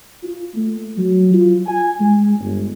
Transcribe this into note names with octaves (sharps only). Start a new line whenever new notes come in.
F4
A3
F#3
F4
G#5
G#3
G1